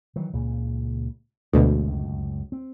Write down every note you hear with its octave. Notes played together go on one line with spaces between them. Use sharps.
D#3 E3 F#3
C#2 A#2 C#3
G1 D2 B2 G#3 A3
C#2 F#2
C4